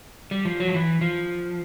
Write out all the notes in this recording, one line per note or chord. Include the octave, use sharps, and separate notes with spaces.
G3
F3
F#3
F3
E3
F3